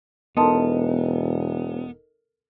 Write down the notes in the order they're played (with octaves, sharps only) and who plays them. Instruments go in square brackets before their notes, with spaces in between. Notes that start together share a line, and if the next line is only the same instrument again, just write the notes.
[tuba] E1 [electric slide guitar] B3 [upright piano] D#4 A4 A#4 [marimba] A5 C6 D#6